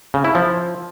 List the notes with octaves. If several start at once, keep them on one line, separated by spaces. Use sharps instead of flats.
C#3
E4
F3